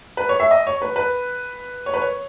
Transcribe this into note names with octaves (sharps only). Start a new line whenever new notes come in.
B4
C#5
E5
D#5
C#5
B4
B4
C#5
B4
C#5